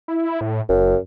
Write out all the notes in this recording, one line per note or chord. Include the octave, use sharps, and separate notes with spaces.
E4
A2
F#1 F#2